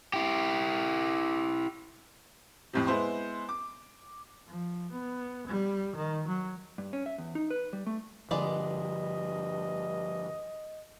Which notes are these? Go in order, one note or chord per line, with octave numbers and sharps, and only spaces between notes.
E4 G4
F2 A2 C3
G#3 B3 E4 C5
D6
F3
B3
G3
D#3
F#3
G2
C#4
E5
E2
D#4
B4
G3
A3
G2 D3 F3 G#3 B3 D5 D#5